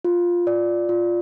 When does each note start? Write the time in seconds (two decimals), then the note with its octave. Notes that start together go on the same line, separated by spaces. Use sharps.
0.04 F4
0.47 D5
0.89 F4